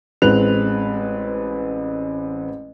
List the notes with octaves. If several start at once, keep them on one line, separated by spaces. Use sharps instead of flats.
A1 G#3 C4 B4 F#6 F7